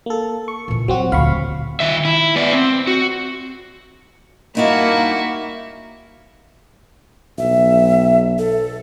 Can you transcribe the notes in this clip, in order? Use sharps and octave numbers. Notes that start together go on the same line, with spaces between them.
A#3 A4
C#6
A#2 E3
F#3 G3 C4 F#4
D2 A#2 F5 B5 C#6
D#3 E5
E4
B3 D5
C4
F#4
G2 A#3 D#4 E4 F#4 A5
B1 E5
A4